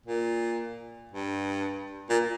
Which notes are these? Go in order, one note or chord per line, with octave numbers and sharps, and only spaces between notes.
A#2
G2
A#2